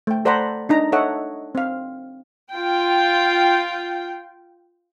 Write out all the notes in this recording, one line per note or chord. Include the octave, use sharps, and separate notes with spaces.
A3 G5
A4 C5 D5 F#5 A#5 B5
D4 D#4 A#5
A4 C#5 D#5 E5 F#5
C4 F5
F4 G5